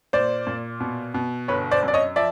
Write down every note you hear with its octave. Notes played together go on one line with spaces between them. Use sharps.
A#2 C5 D5
A#2
B2
B2
G1 B4 C#5
C5 D5
F#2
D5
C#5 D#5
F3 D5 E5